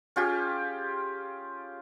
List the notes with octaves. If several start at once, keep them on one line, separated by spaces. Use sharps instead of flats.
C#4 F4 G4 G#4